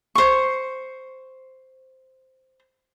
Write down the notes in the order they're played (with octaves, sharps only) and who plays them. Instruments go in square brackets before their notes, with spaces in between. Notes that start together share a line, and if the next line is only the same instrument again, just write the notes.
[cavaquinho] C5 C#6